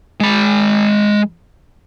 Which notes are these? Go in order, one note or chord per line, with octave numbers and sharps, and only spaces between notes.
G#3 B5